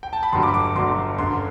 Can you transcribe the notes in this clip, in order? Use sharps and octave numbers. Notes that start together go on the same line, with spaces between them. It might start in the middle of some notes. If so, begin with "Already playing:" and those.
G5
A5
B5
G1 G2 F#3 A3 C6
D6
D6
G1 G2 F#3 A3 C6
G1 F#2 D3 C6